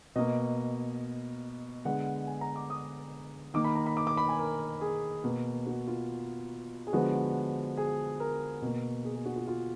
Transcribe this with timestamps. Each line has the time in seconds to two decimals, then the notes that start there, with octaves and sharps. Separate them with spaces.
0.16 B2 A#3 D#5
1.85 D3 G#3 B3 F#5
2.27 G#5
2.41 A#5
2.56 D6
2.70 D#6
3.54 D#3 A#3 D6
3.64 B5
3.75 A#5
3.86 B5
3.97 D6
4.07 D6
4.17 B5
4.29 G#5
4.39 A#4
4.81 G#4
5.24 B2 A#3
5.66 F#4
5.88 F4
6.87 G#4
6.93 D3 F3 G#3 B3 F#4
7.77 G#4
8.20 A#4
8.62 B2 A#3
9.05 G#4
9.15 G#4
9.26 F#4
9.36 F4
9.48 F4